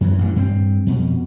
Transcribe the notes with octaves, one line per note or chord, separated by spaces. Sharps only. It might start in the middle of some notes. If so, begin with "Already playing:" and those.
F#2 E3
A1 G2
G2 C4
F2 B2